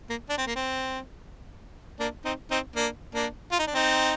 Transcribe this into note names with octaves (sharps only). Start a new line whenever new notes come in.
A#3
D4
C4
A#3
C4
A#3 D4
C4 D#4
C4 D#4
A#3 D4
A#3 D4
F4
D#4
D4
C4 D#4